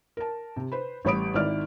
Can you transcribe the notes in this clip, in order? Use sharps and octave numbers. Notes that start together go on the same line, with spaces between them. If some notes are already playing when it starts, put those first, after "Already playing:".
A#4 A5
C3
B4 C5 B5
A1 G3 C#5 B5 D#6 D7
G#1 D#3 E4 D5 F6 D7